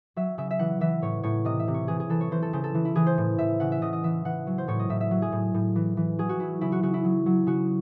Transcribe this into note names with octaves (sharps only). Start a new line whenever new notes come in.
F#3 E5
C#3 E5
E5
E3 F#5
E3 E5
A2 C#5
A2 C#5
C3 D#5
E5
C3
C#5
E3 G#4
G#4
E3 A4
C#5
E3 C5
A4
C#3 C5
A4
E3
E4
E3 G#4
C5
A2
A2 E5
C#3 F#5
E5
C#3 D#5
D#5
E3 E5
E3 F#5
F#3
C5
A2 C#5
D#5
A2 E5
E5
F#3
G#4
A2
A2
E3
E3
F#3 G#4
F#4
F#3 E4
C#3 E4
F#4
C#3 F#4
E4
F#3
F#3
C#3 F#4